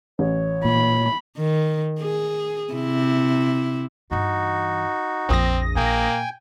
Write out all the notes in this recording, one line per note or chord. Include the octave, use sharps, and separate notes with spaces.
A1 C#5
A#2 B5
D#3
G#4
C3 E4
G2 E3 D#4 F#4
A#1 F2 C4 D4 D#6 A#6
A#2 A#3 G5 G#5